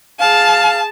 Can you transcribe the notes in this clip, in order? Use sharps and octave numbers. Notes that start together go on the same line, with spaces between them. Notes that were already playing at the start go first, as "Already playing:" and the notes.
G#4 F5 A5